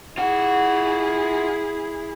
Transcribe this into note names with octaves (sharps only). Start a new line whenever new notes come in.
E4 F4 G#4 F#5